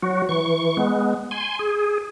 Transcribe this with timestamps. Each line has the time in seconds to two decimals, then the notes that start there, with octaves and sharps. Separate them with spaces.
0.02 F#3 F#4
0.29 E3 C#6
0.77 G#3 B3
1.31 G#5 C6
1.59 G#4